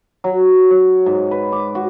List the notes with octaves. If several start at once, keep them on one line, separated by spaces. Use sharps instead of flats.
F#3
C#5
G#2
B4
D6
F#4